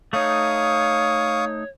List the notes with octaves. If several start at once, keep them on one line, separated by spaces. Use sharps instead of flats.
A3 D#4 C#5 F5 C#6 D#6